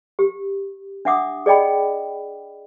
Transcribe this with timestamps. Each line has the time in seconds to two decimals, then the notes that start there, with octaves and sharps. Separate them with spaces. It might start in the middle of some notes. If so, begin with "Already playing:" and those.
0.19 G4
1.05 D4 E5 F#5 D6 D#6
1.46 G#4 D5 D#5 G5 B5